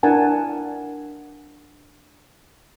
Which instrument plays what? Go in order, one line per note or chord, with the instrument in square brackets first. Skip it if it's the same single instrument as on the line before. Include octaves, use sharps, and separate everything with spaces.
[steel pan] D4 E4 A#4 F#5 G#5 A5